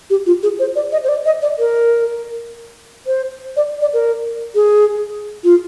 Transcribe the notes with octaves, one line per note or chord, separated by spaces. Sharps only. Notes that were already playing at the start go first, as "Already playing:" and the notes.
G4
F4
G#4
C5
D5
D#5
C5
D5
D#5
D5
A#4
C5
D5
D5
A#4
G#4
F4